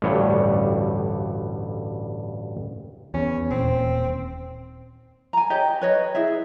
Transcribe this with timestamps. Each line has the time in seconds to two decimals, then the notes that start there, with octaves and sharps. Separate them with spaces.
0.02 A1 D2 G2 G3 C#5
3.14 E2 C#4
3.50 D#1 C4
5.33 G#5 A#5
5.50 G4 C#5 D#5
5.82 B4 C#5 D#5
6.15 E4 G#4 E5